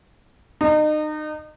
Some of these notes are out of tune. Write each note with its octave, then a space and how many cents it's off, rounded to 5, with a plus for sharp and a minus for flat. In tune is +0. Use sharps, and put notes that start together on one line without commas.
D#4 -30